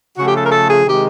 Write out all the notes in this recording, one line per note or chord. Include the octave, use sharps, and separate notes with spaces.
C#3 F3 A3 F#4
G4
A4
A#4
A4
G#4
C3 D#3 G#3 G4